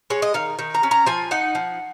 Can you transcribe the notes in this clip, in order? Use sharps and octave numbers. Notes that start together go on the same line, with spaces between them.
G#3 C#5
D#5
D#3 F5
D#3
A#5
C#4
A#5
F3 G#5
D#4 F#5
F3